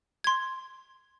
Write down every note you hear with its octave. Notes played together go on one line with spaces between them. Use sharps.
C6 G#6